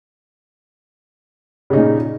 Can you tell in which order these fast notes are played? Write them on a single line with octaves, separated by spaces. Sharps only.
C#3 D#4 A#2